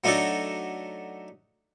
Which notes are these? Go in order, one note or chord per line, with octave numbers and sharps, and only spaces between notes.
F#3 A3 D4 D#4 F#4 A4